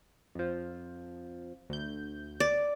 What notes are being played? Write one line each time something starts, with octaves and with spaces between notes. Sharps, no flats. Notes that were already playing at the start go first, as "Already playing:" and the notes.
F2 F3
D2 G6
D5